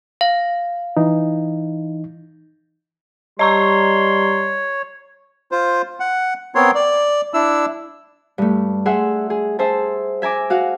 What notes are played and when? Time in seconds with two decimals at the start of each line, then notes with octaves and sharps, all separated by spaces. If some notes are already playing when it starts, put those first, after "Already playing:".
0.21 F5
0.97 E3 D#4
3.39 G3 C#5 D#5 A#5 C6 C#6
5.52 F4 C5
6.00 F#5
6.55 B3 C4 A#4 C#5 C6
6.75 D5
7.34 D4 E4 E6
8.38 G2 A3
8.86 G#4 E5 F#5 C6
9.30 G#4
9.59 G#4 C5 E5 A5
10.22 E5 G#5 A#5 D6
10.50 F#4 F5 F#5